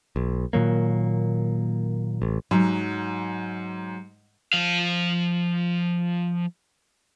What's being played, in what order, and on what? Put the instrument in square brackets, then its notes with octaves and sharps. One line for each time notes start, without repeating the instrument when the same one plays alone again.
[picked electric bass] B1
A#2 D#3 F#3 A#3
A1
[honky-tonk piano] G#2 [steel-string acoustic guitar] F#3
[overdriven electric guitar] F3 F5